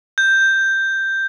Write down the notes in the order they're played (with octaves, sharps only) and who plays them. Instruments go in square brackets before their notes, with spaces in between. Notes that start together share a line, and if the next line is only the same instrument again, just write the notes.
[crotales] G6